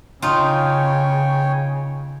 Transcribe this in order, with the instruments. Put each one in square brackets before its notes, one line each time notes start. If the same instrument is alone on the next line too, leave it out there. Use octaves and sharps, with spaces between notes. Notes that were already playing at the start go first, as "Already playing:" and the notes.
[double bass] C#3 [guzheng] D#4 F4 [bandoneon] C#5 G5 G#5